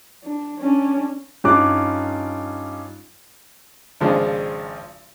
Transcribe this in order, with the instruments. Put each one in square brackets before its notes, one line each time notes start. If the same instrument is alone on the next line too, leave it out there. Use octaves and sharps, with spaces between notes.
[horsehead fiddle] D4
C#4 D4
[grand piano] G2 C#4 D#4 F4 D6 F#6
[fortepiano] G#1 C#3 F3 G#3 D4